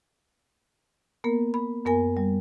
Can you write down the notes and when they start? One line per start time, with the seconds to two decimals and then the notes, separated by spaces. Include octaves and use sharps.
1.24 A#3 B3 A#4
1.54 B5
1.85 F#2 B3 A#4 G#5
2.17 G3